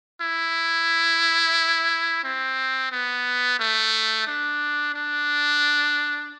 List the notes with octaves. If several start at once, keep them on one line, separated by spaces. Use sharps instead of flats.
E4
C4
B3
A3
D4
D4